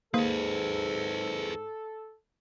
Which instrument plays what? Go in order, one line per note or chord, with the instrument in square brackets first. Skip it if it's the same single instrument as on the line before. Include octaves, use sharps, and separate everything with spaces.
[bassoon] G#2 [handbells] A#3 [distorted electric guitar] G#4 B4 [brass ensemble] A4